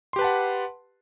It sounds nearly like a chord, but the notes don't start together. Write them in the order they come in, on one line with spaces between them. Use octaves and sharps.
C6 G4 B4 A5 F#5